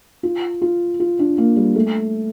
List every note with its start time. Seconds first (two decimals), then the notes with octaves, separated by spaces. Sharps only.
0.23 F4
0.62 F4
1.00 F4
1.19 D4
1.38 A#3
1.56 G3
1.76 A3